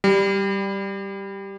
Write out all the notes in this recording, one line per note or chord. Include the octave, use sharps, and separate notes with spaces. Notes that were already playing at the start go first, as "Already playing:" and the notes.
G3